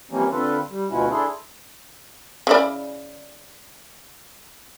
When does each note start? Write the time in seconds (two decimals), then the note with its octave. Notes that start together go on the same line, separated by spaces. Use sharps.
0.11 E3 F3 G3 A#3 C4 C#4
0.32 D3 C4 F4 A4 B4
0.70 G3
0.91 D2 B2 F3 C#4 E4 F#4
1.11 D4 E4 G#4 A4 C5
2.47 C#3 E4 D5